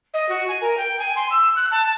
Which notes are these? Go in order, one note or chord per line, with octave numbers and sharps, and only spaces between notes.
D#5
F#4
G#5
A#4
G5
G#5
C6
E6
F#6
A5